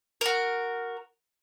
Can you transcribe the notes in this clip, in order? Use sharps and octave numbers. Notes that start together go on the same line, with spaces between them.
F#4 A#4